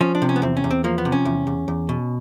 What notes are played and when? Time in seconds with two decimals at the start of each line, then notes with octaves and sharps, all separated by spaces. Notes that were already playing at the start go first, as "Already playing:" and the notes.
0.01 F3 C#4
0.15 D4
0.22 C3
0.29 C#4
0.36 B3
0.42 E2 C4
0.57 C#4
0.64 E2
0.71 C4
0.84 F3 A#3
0.98 B3
1.05 C3
1.12 C#4
1.25 E2
1.47 E2
1.68 E2
1.89 B2